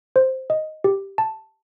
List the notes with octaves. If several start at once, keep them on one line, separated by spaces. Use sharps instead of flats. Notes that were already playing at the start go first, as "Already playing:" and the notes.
C5
D#5
G4
A5